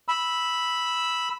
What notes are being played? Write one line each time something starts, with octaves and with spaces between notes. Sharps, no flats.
B5 E6